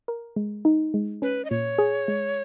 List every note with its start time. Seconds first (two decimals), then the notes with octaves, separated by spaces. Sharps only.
0.08 A#4
0.36 G#3
0.65 D#4
0.94 G#3
1.22 C#4 B4
1.45 D#5
1.50 A#2 C#5
1.78 G#4
2.08 G#3